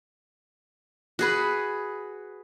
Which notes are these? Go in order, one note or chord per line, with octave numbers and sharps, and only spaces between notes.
F#4 G#4 B4